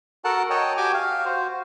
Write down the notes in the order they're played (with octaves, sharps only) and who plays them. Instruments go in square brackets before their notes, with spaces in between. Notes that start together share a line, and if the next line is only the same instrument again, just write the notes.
[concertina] F#4 A4 A#4 F#5 A5
C#5 D#5 G5 A5
F#4 G4 G5 G#5 D6
F5
F#4 C5